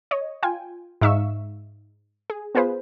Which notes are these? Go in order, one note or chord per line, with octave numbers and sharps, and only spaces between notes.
C#5 D#5
F4 G5 G#5
G#2 D#4 E5 F5 C#6 E6
G#4
B3 F4 G#4 B4 C5